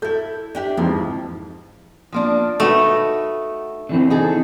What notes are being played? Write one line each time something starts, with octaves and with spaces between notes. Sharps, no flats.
E4 A4 G6
D4 G4 E5
F2 G#2 E3 F3
F3 A#3 D4
A3 D#4 F#4 B4
D3 E3 C4
D#4 G#4 A4